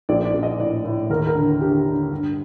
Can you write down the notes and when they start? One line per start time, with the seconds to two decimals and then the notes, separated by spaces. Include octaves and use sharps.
0.09 A#1 D5
0.25 D5
0.34 A#1
0.43 D#5
0.59 A2 D5
0.84 A2
1.10 D#2 A#4
1.27 A#4
1.35 D3
1.61 D3 G4
1.86 D3
2.11 G2